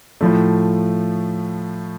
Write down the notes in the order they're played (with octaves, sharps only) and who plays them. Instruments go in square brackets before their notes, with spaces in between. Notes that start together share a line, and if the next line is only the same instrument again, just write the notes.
[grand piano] A2 F3 A3